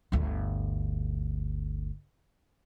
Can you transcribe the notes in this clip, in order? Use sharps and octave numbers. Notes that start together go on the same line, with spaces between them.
G1 D2